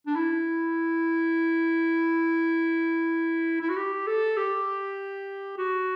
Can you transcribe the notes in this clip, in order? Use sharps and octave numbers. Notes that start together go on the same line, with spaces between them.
D4
E4
E4
F#4
G4
A4
G4
F#4